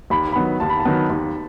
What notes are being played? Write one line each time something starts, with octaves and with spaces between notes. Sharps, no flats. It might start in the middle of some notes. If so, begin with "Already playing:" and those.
D#2 B5
D#3 F#3 B3 B5
D#2 A5
B5
A5
D#3 F#3 B3
D#2